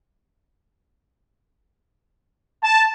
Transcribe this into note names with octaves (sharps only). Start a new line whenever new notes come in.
A5